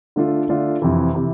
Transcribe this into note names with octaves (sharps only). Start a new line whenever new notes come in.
D3 A3 D4 F4 A4
D3 A3 D4 F4 A4
F2 C3 E3
C3 E3